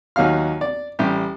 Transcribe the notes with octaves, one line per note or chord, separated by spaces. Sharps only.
D#2 F#3 D#4 F5 F6
D5
A1 G3 G4